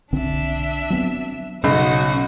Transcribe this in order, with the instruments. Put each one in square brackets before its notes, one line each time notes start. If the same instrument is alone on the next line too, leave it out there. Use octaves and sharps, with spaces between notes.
[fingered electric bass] B1 D3 C4 [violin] D4 E5
[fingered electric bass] F#3 B3 C4
[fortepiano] B1 [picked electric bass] C#3 [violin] D#4 F#4